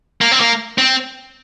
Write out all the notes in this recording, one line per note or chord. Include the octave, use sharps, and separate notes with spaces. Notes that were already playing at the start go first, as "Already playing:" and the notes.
A#3
C4
A#3
C4